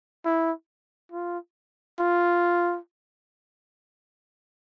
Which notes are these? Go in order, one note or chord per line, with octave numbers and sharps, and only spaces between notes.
E4
F4
F4